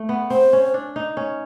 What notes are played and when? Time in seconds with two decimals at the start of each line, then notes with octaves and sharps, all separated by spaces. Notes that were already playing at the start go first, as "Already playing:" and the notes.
Already playing: A3
0.09 B3
0.30 C4 C5
0.53 C#4
0.74 D4
0.96 D#4
1.17 C#4